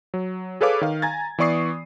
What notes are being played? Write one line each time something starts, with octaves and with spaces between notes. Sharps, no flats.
F#3
G#4 A4 B4 C#5 F5 D6
D#3 F5
G#5 A#5 G#6 A6
E3 B3 D5 C#6 D#6 C7